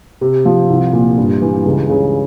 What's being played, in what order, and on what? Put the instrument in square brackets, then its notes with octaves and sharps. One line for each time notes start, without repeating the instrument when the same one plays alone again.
[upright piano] C3
F3
C2
A#2
G2
E3
C#2
C#3